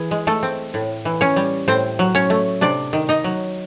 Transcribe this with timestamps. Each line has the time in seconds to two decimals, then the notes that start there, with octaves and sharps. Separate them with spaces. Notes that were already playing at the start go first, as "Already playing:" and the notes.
Already playing: E3 G#4
0.11 G#3
0.27 A3 A4
0.43 C4
0.74 A2
1.05 E3
1.21 C#4 C#5
1.36 G3
1.68 A2 C4 C5
1.99 F#3
2.15 C#4 C#5
2.30 A3
2.61 C3 D4 D5
2.93 D#3
3.09 D#4 D#5
3.24 F#3